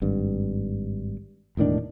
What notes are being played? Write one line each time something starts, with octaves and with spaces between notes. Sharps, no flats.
G#1 G2
E1 A2 D#3 D4